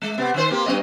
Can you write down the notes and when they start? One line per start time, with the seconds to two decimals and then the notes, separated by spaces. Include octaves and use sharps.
0.02 G#3
0.18 C3 B3
0.34 D#3 C5
0.50 A#3 C4 G4
0.66 G2 B3 D#5